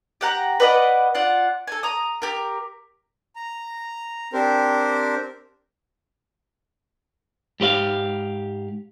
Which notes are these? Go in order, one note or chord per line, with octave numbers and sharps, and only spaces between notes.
G4 F#5 A#5
B4 D5 D#5 F#5
F4 D5 F#5
A4 G#5
A#5 D#6
G4 A#4
A#5
C4 D4 G4 A#4 C5
G#2 G4 B4 F5